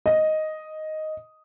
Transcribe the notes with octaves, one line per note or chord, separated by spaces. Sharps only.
D#5